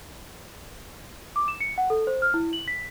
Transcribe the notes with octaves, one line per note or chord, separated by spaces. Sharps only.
D6
E7
C#7
F#5
A4
C5
F6
E4
F#7
B6